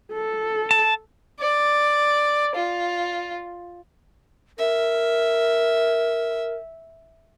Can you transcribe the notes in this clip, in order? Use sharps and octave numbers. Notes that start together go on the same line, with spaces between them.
A4
A5
D5
F4
A#4 E5